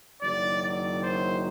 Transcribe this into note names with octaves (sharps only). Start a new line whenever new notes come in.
F#1 F#2 D#3 F#3 D5
D5
C5